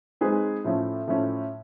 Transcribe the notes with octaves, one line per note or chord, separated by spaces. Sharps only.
G#3 C4 D#4 G#4 B4
A2 F3 A3 C#4
A2 F3 A3 C#4